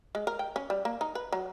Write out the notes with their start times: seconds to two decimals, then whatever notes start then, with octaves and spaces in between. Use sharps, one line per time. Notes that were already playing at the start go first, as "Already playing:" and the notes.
0.15 G#3
0.27 A#4
0.39 G5
0.56 C#4
0.70 G3
0.85 A#3
1.01 D#4
1.15 B4
1.32 F#3